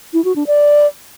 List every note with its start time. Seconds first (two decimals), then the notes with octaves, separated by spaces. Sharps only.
0.13 E4
0.25 F#4
0.36 D4
0.47 D5